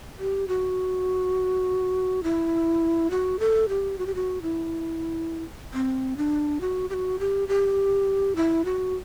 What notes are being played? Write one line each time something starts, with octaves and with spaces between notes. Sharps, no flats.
G4
F#4
E4
F#4
A4
G4
F#4
G4
F#4
E4
C4
D4
F#4
G4
F#4
G4
G4
E4
F#4